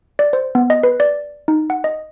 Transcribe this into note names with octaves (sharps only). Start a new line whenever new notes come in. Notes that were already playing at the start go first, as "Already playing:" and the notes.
D5
C5
B3
D#5
B4
D5
D#4
F#5
D#5